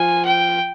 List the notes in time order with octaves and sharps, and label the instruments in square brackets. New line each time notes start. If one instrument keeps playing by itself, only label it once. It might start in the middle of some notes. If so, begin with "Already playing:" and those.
Already playing: [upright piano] F3 F4 [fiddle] G#5
[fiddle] G5